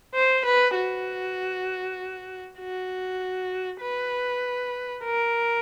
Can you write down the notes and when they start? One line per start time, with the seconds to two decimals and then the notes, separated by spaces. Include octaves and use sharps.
0.15 C5
0.45 B4
0.75 F#4
2.59 F#4
3.81 B4
5.04 A#4